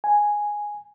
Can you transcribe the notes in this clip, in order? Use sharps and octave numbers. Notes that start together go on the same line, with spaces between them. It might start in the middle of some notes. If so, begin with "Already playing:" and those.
G#5